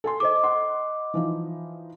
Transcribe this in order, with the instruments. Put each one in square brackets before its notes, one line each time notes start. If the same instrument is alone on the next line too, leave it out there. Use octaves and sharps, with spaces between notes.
[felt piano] A4 G#5 C6
[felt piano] A4 C5 [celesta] D#5 D6
[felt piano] F#5 C6
E3 F3 D#4